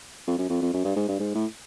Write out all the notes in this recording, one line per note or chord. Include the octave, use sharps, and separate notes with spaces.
F2
F#2
F2
F2
F#2
G2
G#2
G2
G#2
A2